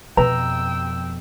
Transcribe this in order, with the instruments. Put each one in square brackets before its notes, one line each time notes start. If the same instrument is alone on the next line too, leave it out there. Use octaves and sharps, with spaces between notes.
[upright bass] F2 B2 [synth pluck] B4 [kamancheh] G5 E6 [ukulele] A#5